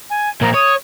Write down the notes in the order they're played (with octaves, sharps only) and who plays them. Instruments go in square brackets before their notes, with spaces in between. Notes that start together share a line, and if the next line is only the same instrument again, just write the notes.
[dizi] G#5
[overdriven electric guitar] A#2 F3 [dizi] A#4
[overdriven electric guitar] C#5 [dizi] D#6